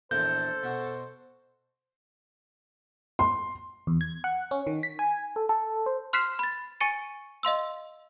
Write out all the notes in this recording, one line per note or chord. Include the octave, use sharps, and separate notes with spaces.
A#1 E2 A4 A#4 C5 G6
B2 F#4
C6
E2
G#6
F#5
C#4
D#3
B6
G#5
A4
A4
C5
C6 F6 F#6 B6 C7 E7
B5 A6
G#5 C#6 A6 C#7 D#7
D#5 F5 C6 E6